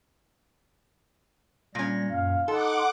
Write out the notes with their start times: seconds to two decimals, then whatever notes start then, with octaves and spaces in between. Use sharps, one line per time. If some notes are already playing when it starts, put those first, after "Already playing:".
1.75 A#2 G3 C#4 A#6
2.10 F#2 F5
2.48 D#4 A4 F#5 C6 D6